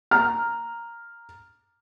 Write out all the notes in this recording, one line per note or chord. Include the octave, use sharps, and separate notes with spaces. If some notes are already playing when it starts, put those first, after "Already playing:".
A#5 F6